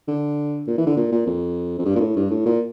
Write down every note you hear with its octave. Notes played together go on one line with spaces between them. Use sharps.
D3
A#2
E3
D3
A#2
A#2
F2
F2
G2
A#2
A2
G2
A2
A#2